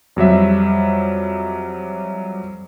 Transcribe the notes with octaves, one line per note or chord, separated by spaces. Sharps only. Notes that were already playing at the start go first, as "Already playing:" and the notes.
F2 F#3 G3 E5